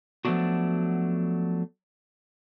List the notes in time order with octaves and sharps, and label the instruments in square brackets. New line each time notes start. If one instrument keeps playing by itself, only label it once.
[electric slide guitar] F3 F#3 A3 B3 D4 F#4